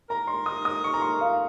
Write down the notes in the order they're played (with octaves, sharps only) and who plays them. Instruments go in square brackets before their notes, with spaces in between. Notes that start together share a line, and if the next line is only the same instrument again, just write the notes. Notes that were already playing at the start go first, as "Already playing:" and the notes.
[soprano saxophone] A#4 [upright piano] A#5
[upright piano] C6
D#6
D#6
C#6
A#5
C6
F5